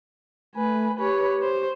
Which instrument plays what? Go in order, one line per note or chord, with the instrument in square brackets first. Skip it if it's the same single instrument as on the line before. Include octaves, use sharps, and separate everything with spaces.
[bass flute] A3 [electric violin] B4 G#5
[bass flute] G4 [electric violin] B4 C#5
[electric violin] C5